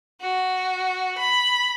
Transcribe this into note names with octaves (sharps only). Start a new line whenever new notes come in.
F#4
B5